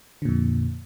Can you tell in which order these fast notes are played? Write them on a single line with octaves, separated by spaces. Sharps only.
D3 A#2 F2